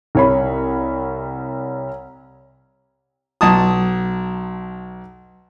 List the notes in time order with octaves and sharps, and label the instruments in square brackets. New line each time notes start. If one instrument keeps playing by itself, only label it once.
[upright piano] C2 C#5 B5
[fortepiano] B1 A5 D#6